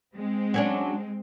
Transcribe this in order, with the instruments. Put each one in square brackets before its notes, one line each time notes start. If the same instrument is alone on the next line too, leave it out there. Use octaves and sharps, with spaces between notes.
[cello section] G#3 C4
[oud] F#3 C#4 D4